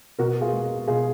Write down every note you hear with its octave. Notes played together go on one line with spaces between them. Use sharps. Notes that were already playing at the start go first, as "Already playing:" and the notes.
B2 F#4 A#4
F4 G#4
G#3
B2 F4 G#4